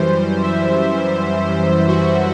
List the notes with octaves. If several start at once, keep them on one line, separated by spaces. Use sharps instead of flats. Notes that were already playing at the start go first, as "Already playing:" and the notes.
Already playing: F#2 E3 G3 C5
E5
F#4